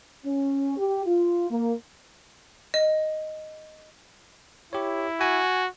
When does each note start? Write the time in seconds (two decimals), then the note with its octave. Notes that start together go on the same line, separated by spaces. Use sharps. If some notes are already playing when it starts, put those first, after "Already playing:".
0.25 C#4
0.77 G4
1.06 F4
1.50 A#3
2.74 D#5
4.73 E4 G4 C#5
5.21 F#4 G#5